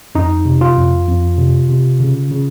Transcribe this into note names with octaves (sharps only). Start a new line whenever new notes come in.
F2 D#4
C3
F4
F2
F2
C3
C3
C#3
C#3